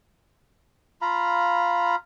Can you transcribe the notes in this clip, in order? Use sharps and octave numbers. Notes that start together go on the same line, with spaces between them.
F4 F5 A#5 B5